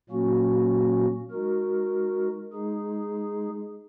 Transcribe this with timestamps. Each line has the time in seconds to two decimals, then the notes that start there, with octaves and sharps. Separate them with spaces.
0.09 A#2 F#3 A#3 C#4 F#4
1.31 G#3 D#4 F#4 A#4
2.53 G#3 D#4 G#4